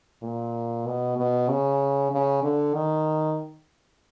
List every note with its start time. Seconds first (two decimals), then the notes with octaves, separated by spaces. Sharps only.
0.23 A#2
0.87 B2
1.17 B2
1.49 C#3
2.12 C#3
2.43 D3
2.74 D#3